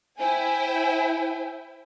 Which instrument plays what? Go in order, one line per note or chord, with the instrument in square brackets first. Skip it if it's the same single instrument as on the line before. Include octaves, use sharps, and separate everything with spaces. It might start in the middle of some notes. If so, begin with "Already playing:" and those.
[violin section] E4 G5 G#5 [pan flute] C5